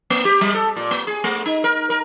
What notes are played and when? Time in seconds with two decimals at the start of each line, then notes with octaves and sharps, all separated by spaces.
0.10 A#3
0.25 G4
0.41 G3
0.55 A4
0.76 A#2
0.91 A#3
1.07 G#4
1.24 A3
1.46 D#4
1.64 A#4
1.90 A#4